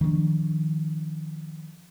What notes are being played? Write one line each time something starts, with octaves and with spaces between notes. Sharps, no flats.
D#3 F3 G#3 D4